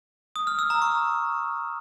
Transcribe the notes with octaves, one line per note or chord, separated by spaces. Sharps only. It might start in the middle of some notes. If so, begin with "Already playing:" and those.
D#6
F6
E6
A#5
C#6